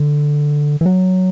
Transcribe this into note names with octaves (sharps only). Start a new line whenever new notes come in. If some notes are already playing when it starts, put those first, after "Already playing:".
Already playing: D3
E3
F#3